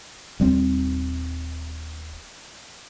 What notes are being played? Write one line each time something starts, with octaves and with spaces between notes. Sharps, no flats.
D#1 G3 C4